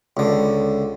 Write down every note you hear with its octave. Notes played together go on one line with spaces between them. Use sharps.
C#2 D3